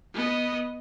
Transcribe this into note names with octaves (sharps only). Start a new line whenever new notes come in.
B3 D#5